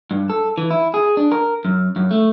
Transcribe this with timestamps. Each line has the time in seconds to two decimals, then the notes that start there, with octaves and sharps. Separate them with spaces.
0.11 G2
0.30 A4
0.58 E3
0.71 E4
0.94 G#4
1.17 D4
1.32 A#4
1.65 F#2
1.96 F#2
2.11 A3